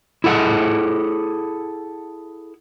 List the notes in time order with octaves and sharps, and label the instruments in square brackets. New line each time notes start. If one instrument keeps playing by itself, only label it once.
[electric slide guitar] E4 G#4 A4 F#5